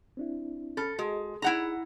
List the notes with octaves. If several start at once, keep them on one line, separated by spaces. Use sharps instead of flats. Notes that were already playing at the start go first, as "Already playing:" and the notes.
C4 D4 E4
C#4 A4 B5 F6
G#3 F#4 G#4 D#5
D#4 E4 G#4 F#5 A#5 B5